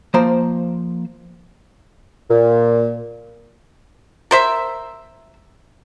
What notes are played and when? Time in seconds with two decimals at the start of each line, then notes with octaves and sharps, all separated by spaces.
0.14 F3 A#3 C5 A#5
2.30 A#2
4.31 A#4 C5 E5